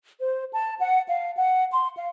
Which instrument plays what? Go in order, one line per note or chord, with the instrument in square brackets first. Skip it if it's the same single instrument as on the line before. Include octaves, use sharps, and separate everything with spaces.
[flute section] C5
A5
F#5
F5
F#5
C6
F5